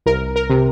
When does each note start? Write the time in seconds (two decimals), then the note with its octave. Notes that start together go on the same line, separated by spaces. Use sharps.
0.06 C2 A#4
0.36 A#4
0.49 C3